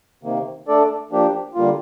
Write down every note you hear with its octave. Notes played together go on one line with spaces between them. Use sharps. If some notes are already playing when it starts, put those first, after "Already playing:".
C3 D#3 A#3
A3 D4 A4 D5
F3 A#3 D4 G4
D3 G3 A#3 F4